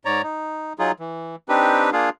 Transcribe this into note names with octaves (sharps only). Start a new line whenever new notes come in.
G#2 C#5 D5 A#5
D#4
F#3 D#4 F4 G#4
E3
C4 D4 D#4 G4 B4
A#3 D4 F4 G#4 F5